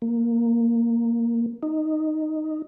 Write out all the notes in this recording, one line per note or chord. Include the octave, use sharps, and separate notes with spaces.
A#3
D#4